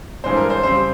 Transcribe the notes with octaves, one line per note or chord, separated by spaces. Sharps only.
G2 E3 G#3 C4 C5
A#4
C5
F2 C#3 G3 C4 C5